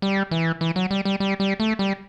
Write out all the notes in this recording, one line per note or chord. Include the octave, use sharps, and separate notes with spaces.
G3
E3
E3
F#3
G3
G3
G3
G3
A3
G3